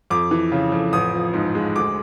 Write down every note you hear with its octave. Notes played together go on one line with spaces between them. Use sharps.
F2 D6
E3
C#3
F2
A1 D#6
F3
G#2
G#3
D2 D6